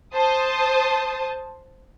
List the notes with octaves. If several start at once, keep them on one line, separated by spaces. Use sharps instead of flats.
C5 A5 D#6